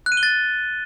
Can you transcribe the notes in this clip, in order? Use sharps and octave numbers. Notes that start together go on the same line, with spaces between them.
F#6
D#7
G7
A6